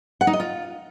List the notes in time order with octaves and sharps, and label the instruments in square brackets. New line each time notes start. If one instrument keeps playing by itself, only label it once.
[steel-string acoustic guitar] F#5
D#4
D#5
F4